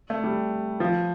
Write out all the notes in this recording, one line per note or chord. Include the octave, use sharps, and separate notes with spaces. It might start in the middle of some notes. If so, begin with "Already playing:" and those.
A3
G3
F3